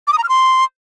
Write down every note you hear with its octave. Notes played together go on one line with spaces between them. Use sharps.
D6
D#6
A#5
F6
C6